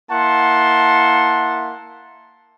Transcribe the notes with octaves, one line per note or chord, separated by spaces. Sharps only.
A#3 E4 F#5 A5 C6